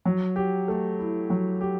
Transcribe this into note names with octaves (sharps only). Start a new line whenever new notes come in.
F#3
G4
A3
E4
F#3
G4